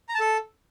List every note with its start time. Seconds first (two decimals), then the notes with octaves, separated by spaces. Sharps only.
0.09 A#5
0.14 A5
0.20 A4